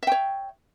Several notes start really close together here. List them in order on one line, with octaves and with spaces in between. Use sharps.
E5 G5 C#5